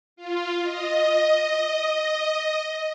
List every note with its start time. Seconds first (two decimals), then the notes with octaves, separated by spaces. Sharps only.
0.16 F4
0.62 D#5